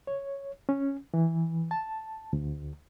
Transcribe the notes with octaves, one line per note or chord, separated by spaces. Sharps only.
C#5
C#4
E3
A5
D2